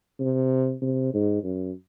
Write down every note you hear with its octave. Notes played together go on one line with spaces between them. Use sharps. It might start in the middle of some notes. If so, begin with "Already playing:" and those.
C3
C3
G#2
F#2